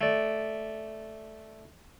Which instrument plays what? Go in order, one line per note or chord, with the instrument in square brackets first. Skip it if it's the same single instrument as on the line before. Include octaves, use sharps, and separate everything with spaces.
[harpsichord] A3 D5